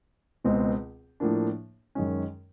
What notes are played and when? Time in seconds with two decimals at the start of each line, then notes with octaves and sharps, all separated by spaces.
0.44 C#2 B2 G#3 C4
1.20 A2 F3 A#3 D4
1.95 F#2 D#3 G#3 C#4